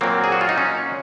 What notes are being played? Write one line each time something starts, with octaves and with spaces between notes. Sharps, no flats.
A#2 F#3 A#3 C4
G#4
F#4
F4
D#4
C#4